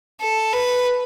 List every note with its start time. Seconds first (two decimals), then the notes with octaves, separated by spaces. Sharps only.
0.21 A4
0.53 B4